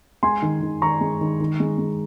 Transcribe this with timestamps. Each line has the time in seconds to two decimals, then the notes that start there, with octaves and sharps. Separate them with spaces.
0.23 G#3 G#5 C6
0.42 D#3
0.62 D#3
0.82 D#3 A#5 C#6
1.01 G#3
1.21 D#3
1.40 D#3
1.60 G#3
1.78 G#3